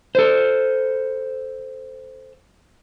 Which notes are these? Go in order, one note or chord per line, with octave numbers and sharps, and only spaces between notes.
A4 C5